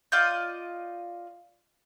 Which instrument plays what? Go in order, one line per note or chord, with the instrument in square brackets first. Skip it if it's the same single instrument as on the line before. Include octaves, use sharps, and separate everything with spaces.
[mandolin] F4 D5 D#5 G6